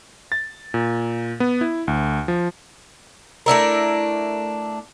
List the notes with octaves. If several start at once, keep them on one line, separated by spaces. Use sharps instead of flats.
A6
A#2
B3
E4
D2
F3
A3 D4 E4 A#4